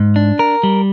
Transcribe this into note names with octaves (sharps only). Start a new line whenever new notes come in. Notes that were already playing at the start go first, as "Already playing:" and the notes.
Already playing: G#2
D4
A#4
G3